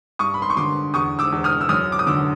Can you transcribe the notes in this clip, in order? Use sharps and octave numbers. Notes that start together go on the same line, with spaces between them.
G2 C#6 D#6
B5
C6
C#6
D3 C6 D6
E2 C#6 D#6
D6 E6
E2
D#6 F6
E6
F#2 D#6 F6
D6
D#6
D3 D6 E6